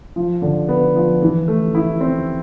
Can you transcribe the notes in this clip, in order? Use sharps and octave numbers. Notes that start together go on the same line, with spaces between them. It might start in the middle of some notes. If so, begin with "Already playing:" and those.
F3
D3
B3
F3
E3
A3
E4
C4